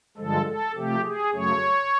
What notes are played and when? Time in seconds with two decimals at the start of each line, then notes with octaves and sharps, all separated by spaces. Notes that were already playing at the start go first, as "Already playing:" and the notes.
0.17 G2 D3 F3 G#3 A4
0.46 A4
0.75 C3 F3 A3 G4
1.04 G#4
1.33 F#2 C#3 F#3 A3 C#5